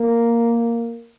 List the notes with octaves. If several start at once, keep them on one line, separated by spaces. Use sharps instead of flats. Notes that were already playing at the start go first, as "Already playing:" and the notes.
Already playing: A#3